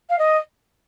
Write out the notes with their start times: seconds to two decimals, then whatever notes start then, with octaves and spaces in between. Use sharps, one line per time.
0.10 F5
0.19 D#5